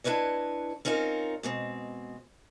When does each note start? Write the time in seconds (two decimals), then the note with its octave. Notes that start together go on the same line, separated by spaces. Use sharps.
0.04 D4 E4 B4 C#5 D#5
0.85 C4 C#4 D#4 F4 A#4
1.43 B2 G#3 C4